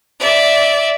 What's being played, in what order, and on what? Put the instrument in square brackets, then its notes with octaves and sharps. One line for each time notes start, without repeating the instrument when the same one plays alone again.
[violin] D5 E5